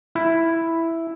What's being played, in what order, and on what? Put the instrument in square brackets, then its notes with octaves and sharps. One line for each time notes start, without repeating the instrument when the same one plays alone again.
[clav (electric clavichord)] E4